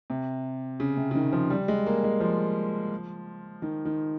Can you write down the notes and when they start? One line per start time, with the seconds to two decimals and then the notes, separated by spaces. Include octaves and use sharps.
0.10 C3
0.80 C#3
0.97 C3
1.11 C#3
1.15 D#3
1.33 F3
1.50 G3
1.68 G#3
1.86 A#3
2.04 G#3
2.20 F3
3.62 D#3
3.85 D#3